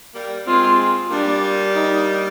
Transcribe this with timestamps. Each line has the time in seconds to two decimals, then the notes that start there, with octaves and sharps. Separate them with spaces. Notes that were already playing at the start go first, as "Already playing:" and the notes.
0.15 G3 A#3
0.47 G#3 C4 F4
1.11 G3 A#3 D4
1.75 D#4